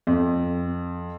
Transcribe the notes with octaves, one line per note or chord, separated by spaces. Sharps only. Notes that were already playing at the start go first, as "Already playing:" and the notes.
F2